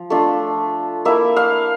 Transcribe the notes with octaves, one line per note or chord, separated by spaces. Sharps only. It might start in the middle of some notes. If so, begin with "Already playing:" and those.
Already playing: F3
A3 D4 F4
A#3 E4 E5
F5